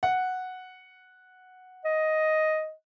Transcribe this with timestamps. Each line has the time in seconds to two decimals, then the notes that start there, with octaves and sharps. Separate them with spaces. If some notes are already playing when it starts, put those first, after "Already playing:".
0.03 F#5
1.85 D#5